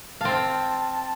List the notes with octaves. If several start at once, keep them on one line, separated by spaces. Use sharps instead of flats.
C4 F5 A5